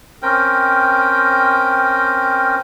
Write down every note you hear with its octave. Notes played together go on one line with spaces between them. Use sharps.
C4 C#4 A#4 G5